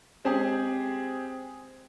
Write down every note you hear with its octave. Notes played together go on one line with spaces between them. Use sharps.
G#3 C4 G4 G#4